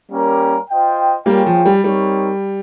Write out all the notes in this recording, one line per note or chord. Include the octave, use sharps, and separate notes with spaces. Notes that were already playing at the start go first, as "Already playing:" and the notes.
G3 A#3 C#4 G4 A#4
F4 C5 D#5 G5
G3 A#3 F4 G#4 C#5 G5
F3
G3
G3 C4 D#4 A#4 C#5